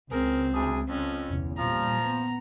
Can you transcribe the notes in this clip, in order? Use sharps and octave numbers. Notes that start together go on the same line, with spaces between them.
C#2 C4 G#4 A#4
D2 G#4
F2 C#4
G1 E2 C3
A#2 F3 G3 A#5
B3